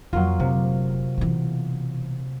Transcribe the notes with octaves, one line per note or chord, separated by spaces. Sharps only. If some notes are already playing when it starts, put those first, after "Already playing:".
F2 F#3 A#3 F4
F1 C3
B2 E3